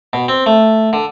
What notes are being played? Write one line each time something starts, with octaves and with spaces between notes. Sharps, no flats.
B2
C4
A3
D3